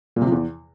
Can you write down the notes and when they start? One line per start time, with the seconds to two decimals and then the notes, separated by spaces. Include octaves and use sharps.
0.16 A#2
0.22 C3
0.27 F3
0.32 E2